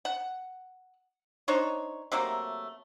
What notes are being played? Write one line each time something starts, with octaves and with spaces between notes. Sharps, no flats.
F#5
D4 D#4 C5 C#5
C3 F#3 A3 A#3